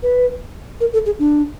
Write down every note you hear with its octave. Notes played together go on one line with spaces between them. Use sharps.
B4
A#4
A4
G#4
D4